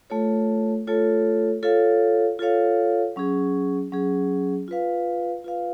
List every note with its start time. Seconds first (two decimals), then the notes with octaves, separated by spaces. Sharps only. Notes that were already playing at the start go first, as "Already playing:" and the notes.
0.10 A3 F4 A4 C#5
0.87 A3 F4 A4 C#5
1.63 F4 A4 C#5 F5
2.39 F4 A4 C#5 F5
3.16 F#3 C#4 G#4
3.92 F#3 C#4 G#4
4.68 F4 B4 F5
5.44 F4 B4 F5